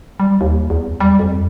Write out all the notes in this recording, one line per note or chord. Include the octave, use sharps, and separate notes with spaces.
G3
D#2
E2
G3
F2